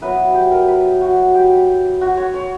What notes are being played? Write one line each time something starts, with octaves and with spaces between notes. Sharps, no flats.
F#3 B3 E4 B4
G4
A#4
B4
F#4
G4
F#4
C#5
C#5